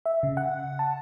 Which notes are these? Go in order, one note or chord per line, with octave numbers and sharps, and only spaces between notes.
E5
C#3
F#5
A5